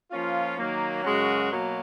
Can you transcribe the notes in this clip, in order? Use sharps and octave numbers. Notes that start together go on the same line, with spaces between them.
F3 A#3 C#4 F4
D#3 F#3 A#3
F#2 C#3 G#3 C#4 F#4
B2 F#3 A#3